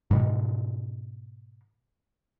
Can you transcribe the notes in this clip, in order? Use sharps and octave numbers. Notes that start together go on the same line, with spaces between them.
G#2 B2 D#3